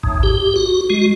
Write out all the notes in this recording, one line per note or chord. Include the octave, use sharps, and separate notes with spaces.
A1 D#2 G#2
G4
F#4
G#3 F#4